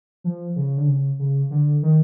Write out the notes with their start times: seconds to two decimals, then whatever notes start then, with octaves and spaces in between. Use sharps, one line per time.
0.24 F3
0.56 C#3
0.77 D3
0.87 C#3
1.19 C#3
1.51 D3
1.83 D#3